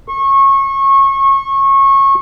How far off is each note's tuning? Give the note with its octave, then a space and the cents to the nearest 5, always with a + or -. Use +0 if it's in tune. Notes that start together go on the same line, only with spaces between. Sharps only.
C#6 -25